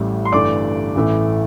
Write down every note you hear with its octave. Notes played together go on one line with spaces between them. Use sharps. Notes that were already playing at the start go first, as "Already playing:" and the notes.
Already playing: A1 A2 G3
C6
G1 G2 E3 A3 D5 D6
A1 A2 E3 A3